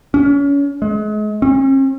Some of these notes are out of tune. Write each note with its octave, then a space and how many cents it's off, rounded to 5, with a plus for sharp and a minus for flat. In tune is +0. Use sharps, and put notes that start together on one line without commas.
C#4 +30
G#3 +35
C#4 -45